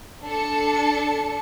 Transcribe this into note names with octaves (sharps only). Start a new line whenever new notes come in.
D4 A4 A5 C#7